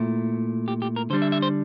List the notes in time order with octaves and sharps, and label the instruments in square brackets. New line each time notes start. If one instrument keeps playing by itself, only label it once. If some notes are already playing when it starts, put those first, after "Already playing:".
Already playing: [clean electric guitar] A#2 A3 E4
G4
G4
A#4
D3 G3 D4 C5
E5
E5
C5